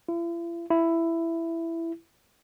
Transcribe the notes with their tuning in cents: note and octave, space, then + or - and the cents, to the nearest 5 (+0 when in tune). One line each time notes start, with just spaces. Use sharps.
E4 +45
E4 +10